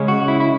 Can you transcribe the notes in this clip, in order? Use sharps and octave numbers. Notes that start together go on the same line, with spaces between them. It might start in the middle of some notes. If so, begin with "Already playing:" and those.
Already playing: C#3 G#3 C#4
F#4
E4
E4